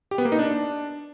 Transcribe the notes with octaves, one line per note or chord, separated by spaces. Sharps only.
G4
B3
A#3
D#4
D4